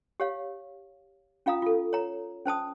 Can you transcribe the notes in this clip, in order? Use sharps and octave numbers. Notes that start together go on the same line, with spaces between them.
G4 C#5 F5
C#4 F4 F5 A#5 D#6
F4 A4
C#5 A#5
C#4 C5 A5 D#6